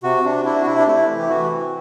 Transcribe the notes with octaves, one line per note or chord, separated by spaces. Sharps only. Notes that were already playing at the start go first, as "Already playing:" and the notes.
C3 F#4
C3 D4
D4 E4
F#4
C3 E4
D4
A3 E4
E3
G4
E3 F#4
C4